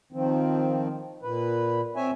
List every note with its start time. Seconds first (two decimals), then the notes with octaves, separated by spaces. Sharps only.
0.12 D#3 F3 C4
1.22 A#2 B4
1.96 C4 C#5 E5 G#5